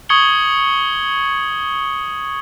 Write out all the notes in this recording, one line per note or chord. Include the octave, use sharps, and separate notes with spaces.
C#6 D#6 G#6 C#7 F#7 G7